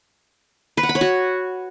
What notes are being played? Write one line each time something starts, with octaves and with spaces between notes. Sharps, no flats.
B4
F#5
B5
C#5
F#4